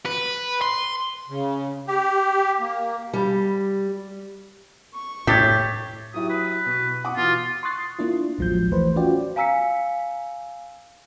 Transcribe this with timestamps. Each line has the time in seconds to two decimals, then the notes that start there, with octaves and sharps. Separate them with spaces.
0.06 B4
0.62 C6
1.29 C#3
1.87 G4
2.60 A#3
3.13 G3
4.94 C#6
5.27 A2 G4 G#6 A6 B6
6.14 F#3 E4 G4 D#6
6.30 B4
6.66 B2
7.04 F#5 D6 D#6
7.17 B2 E3 F4
7.63 C6 C#6 D#6 F#6 A6 C7
7.99 A#3 D4 E4 F4
8.39 A1 D#2 F3 F#3 G#3 G6
8.70 E3 A3 B4 C5
8.96 C#4 F4 F#4 D5 G5
9.36 F5 G#5 A#5 E6 B6 C#7